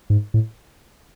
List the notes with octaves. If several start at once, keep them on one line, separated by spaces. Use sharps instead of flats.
G#2
A2